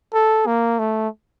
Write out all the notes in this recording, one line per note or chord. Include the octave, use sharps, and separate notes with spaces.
A4
A#3
A3